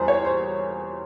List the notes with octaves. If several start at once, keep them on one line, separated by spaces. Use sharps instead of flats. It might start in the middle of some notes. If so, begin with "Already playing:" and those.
Already playing: E1 E2 E3 G3 C4 G#4 C5
C#5
C5